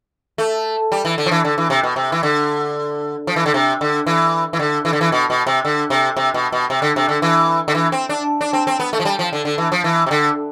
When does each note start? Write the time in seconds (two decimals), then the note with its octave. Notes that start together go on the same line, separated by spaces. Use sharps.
0.38 A3
0.92 G3
1.05 E3
1.18 D3
1.26 F3
1.31 E3
1.45 D3
1.58 E3
1.70 C3
1.83 B2
1.96 C3
2.12 E3
2.23 D3
3.27 F3
3.36 E3
3.46 D3
3.54 C3
3.81 D3
4.07 E3
4.53 E3
4.59 D3
4.85 E3
4.93 D3
5.01 E3
5.12 B2
5.30 B2
5.47 C3
5.65 D3
5.90 C3
6.16 C3
6.34 B2
6.52 B2
6.70 C3
6.82 D3
6.96 C3
7.09 D3
7.22 E3
7.68 D3
7.75 E3
7.92 C4
8.09 D4
8.41 D4
8.53 C4
8.67 C4
8.80 B3
8.93 A3
9.00 F3
9.05 G3
9.19 F3
9.33 D3
9.45 D3
9.58 E3
9.72 F3
9.84 E3
10.06 C3
10.11 D3